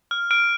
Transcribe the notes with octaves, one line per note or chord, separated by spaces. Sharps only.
F6
F6 D7